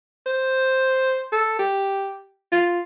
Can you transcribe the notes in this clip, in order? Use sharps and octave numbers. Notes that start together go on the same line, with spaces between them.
C5
A4
G4
F4